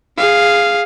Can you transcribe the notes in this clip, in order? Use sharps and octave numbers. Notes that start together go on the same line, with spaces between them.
G#4 F5